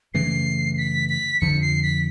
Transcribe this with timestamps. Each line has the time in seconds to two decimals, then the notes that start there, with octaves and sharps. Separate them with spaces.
0.14 F#2 C#3 E3 A3 C7
0.78 B6
1.09 B6
1.41 F2 D3 F3 C#7
1.62 C7
1.83 B6